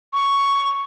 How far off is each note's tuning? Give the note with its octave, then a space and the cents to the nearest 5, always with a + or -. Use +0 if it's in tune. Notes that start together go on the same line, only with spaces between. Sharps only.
C#6 +5